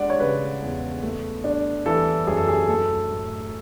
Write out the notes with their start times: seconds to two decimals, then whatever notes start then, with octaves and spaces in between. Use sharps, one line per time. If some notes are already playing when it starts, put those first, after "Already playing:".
Already playing: G#3 D4 D5 F#5
0.10 C#5
0.20 C#3 B4
0.62 E2
1.03 A3
1.44 D4
1.86 E3 A4
2.27 F#2 G#4
2.37 A4
2.48 G#4
2.68 A3 A4
3.10 A2